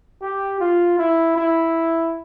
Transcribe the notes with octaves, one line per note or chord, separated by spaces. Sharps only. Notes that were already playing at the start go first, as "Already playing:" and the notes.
G4
F4
E4
E4